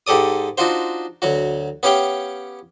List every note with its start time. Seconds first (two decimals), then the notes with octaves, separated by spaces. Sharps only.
0.07 G#2 G4 A4 D5 D#6
0.58 D4 D#4 F4 F#4 C5
1.22 D2 F#3 F#4
1.83 B3 C#4 G4 F5 G5